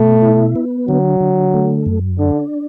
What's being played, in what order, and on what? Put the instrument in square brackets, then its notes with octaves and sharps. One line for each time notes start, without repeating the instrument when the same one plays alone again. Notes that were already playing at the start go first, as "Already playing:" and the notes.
Already playing: [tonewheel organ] B2 [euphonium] A3
[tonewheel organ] E4
B3
[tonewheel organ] D3 [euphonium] F#3
[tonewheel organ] D3
A3
F#2
[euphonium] D3 [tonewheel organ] D4